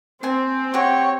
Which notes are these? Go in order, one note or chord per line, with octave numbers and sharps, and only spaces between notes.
C4 C5 G#5
F#4 G4 C#5 G5